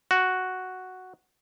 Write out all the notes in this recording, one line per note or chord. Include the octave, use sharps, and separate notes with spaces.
F#4